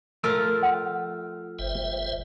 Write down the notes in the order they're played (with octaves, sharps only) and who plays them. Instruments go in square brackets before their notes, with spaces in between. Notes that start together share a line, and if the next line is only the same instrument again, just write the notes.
[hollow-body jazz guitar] F3 A3 A#4 [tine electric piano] E6 F6
[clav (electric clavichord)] F#5
[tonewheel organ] G1 C5 E5